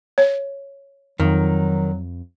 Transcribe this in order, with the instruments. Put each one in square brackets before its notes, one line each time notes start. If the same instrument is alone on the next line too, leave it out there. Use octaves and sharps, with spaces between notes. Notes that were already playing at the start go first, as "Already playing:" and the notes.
[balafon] C#5
[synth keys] F2 [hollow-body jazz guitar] D#3 [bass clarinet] F#3